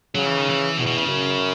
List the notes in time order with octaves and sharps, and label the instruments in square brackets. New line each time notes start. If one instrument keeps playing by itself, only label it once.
[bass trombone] C#3 [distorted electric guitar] F#3
[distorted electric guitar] E3
D#3
E3
[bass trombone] E2 [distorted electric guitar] B2
[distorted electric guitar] B2
C#3
[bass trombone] F#2